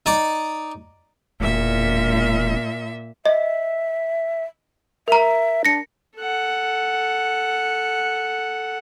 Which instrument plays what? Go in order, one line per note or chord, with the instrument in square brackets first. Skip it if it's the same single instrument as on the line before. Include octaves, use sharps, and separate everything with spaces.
[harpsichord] D#4 D5 D6
[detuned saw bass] E1 [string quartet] A#2 E5
[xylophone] D#5 [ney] E5
[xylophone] A#4 A#5 [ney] E5
[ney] D4 [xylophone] A#6 C#7
[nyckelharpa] A4 F#5